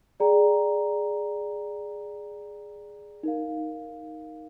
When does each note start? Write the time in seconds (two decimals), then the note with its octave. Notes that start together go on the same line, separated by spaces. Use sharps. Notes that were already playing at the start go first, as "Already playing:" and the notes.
0.20 G#4 D5 G5 A#5
3.23 D#4 A#4 F5